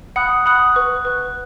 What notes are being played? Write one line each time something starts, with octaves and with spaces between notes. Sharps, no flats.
F#5 B5 D#6 F#6
F#5 B5 D#6 F#6
B4 F#5 C#6 F#6
B4 F#5 C#6 F#6